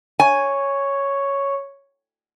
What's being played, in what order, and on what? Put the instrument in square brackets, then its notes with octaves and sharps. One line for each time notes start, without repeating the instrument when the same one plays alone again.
[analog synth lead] C#5 [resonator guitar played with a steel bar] G#5